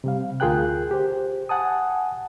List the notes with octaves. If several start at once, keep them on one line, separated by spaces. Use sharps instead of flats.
C3 G3 F5
D2 F4 G#4 A#4 G5 F#6
G4 C5
F#5 G#5 A5 D#6